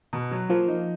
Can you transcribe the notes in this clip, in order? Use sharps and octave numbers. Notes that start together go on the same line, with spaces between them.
B2
F#3
F3 A#3
D#4